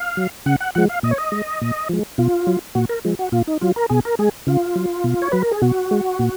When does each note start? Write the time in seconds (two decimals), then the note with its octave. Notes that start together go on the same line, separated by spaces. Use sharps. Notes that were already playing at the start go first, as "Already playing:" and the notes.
Already playing: F5
0.17 F#3
0.46 C#3 F#5
0.60 F#5
0.75 F3 G#3 F#5
0.89 F5
1.03 A#2 D#5
1.11 C#5
1.18 D#5
1.32 G#3
1.62 A#2
1.89 F3 G#3
2.18 B2 F4
2.47 F#3
2.75 A#2 F#4
2.89 A#4
3.05 F3 G#3
3.19 F#4
3.32 A#2 F4
3.47 D#4
3.61 F#3 F4
3.76 A#4
3.90 B2 G#4
4.05 A#4
4.19 G#3 G#4
4.47 C#3 F4
4.76 F#3
5.04 B2
5.22 C#5
5.32 F#3 B4
5.42 A#4
5.51 G#4
5.62 B2 F#4
5.91 G#3
6.19 A#2